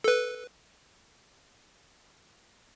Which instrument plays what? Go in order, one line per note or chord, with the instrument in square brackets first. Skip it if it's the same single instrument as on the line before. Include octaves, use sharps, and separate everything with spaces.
[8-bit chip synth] A4 B4